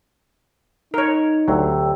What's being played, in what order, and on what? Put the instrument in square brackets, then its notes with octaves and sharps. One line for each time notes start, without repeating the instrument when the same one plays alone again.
[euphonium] D#4 [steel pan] A#4 C#5
[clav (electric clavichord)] D2 F#3 [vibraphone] G4 G5 E6